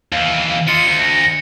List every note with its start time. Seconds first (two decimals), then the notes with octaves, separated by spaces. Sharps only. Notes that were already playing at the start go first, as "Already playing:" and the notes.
0.12 D#2 E3 F5
0.68 F4 D#5 C6 C#7
0.87 D2
0.99 A#6